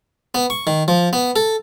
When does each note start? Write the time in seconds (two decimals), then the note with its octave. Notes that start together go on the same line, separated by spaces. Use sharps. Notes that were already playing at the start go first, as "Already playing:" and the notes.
0.35 B3
0.50 C#6
0.67 D#3
0.88 F3
1.13 B3
1.36 A4